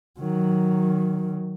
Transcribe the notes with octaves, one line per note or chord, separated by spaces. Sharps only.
D#3 F#3